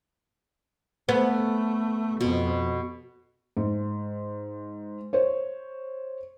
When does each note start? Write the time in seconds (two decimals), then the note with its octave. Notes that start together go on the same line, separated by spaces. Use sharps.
1.09 A3 B3
2.21 F2 B2
3.57 G#2
5.13 C5 C#5